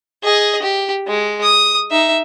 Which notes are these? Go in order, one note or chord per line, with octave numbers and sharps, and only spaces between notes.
G#4 D#5
G4
G#3
D#6
D#4 E5